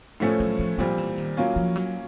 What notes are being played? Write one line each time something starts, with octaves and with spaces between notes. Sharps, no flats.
A2 F3 A3 C#4
F#3
F3
A#2 F3 G3 C4
E3
D#3
F#3 A#3 C#4 F4
F3
F#3